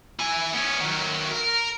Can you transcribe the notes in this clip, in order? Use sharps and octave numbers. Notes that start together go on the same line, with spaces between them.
E4 G#5
B3 C#4
D#3 F#3
A#4